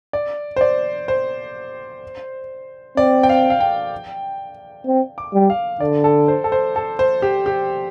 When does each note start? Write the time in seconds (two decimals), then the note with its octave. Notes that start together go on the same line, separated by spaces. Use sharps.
0.13 D5
0.56 C5
0.61 D5
1.08 C5
2.97 C4 D5
3.23 G5
3.29 F5
3.50 F5
3.60 G5
4.86 C4
5.18 D6
5.34 G3
5.50 F5
5.80 D3 D5
6.04 A4
6.28 C5
6.44 A4
6.52 C5
6.76 A4
6.99 C5
7.22 G4
7.46 G4